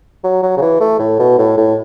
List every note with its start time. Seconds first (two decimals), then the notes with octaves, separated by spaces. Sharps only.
0.24 F#3
0.43 F#3
0.57 C#3
0.62 E3
0.80 A3
0.99 A2
1.19 B2
1.38 A2
1.58 A2